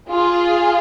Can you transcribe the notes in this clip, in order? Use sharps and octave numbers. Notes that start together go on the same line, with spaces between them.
F4 G#4